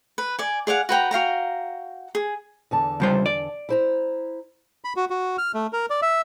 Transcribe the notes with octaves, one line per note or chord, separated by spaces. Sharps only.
B4
D5 G#5
G#4 D5 F5 F#5
F#4 B4 G5 A#5
F#4 F5 G5 A#5
G#4
E2 D3 A5
C#2 G3 C5
D5
E4 C5 A#5
B5
F#4
F#4
F6
A3
A#4
D5
E5